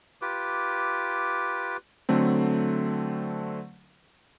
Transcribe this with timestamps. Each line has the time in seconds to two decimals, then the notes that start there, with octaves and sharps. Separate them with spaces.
0.22 F4 G4 B4 D6
2.09 D3 F#3 A3 C4